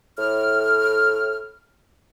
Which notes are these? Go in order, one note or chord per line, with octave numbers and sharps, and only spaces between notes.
A2 F6